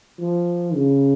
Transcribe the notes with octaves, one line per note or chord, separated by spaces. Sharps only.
F3
C#3